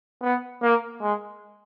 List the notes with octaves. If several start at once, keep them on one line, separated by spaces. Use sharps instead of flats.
B3
A#3
G#3